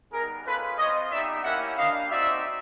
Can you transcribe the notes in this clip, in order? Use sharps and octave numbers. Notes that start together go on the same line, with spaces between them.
G3 B3 D#4 G#4 A#4
G#3 C#4 F4 A4 B4
C4 F4 C#5 D#5
B3 D#4 G4 D5 E5
A#3 C#4 E4 G4 E5 F#5
G3 A#3 D4 G4 D#5 F5
C4 D#4 F#4 D5 E5